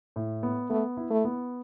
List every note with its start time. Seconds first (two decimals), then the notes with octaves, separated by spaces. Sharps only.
0.16 A2
0.43 B3
0.70 A3 B3
0.97 E4
1.11 A3
1.25 B3